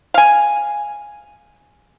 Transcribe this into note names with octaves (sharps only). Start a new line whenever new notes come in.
F5 G#5